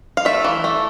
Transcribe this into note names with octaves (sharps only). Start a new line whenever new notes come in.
F5
A3 E5
E3
A3